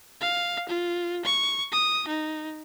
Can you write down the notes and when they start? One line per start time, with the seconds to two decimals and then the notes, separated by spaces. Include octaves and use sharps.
0.21 F5
0.68 F4
1.25 C#6
1.72 D#6
2.08 D#4